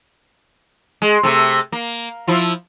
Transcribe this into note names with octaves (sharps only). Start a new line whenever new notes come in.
G#3
C3 A3
A#3
F3 E4 F4